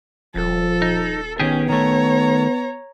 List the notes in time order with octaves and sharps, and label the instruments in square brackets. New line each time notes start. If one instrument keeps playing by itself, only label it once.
[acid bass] D#1 [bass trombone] F3 [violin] A4
[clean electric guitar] D#4
[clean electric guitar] D#3 G4 G#4 [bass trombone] B3 [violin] C#4
[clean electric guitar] D#3 A3 [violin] C#5 A#5